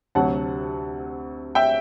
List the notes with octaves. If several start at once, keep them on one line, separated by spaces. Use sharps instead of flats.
D2 C3 F#3 F#5 A5
E5 G5